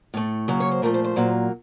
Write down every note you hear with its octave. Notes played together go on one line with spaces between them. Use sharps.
A2 A3
C#3 F#3 A#3
C#5
C5
A#2 F3 A3 A#4
C5
C5
A#2 F#3 A#3